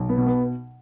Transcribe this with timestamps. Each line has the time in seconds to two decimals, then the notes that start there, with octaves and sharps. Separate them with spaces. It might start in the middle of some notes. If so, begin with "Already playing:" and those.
Already playing: B1
0.09 B3
0.18 B2
0.26 B3